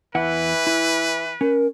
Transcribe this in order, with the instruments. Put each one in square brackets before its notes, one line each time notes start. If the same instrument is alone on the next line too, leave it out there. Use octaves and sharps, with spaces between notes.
[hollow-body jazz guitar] E2 E4 F#5 [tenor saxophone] E3 [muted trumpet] B4
[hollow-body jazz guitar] E4
[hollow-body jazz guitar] C#4 [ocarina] A#4